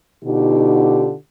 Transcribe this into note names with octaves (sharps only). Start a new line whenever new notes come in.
B2 D3 D#4 F4 G4